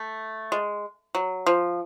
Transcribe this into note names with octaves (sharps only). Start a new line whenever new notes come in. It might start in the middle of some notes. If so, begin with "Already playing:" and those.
Already playing: A3
G#3
F#3
F3